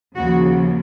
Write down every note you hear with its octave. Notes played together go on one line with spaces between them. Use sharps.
D#2 C#3 F3 F#4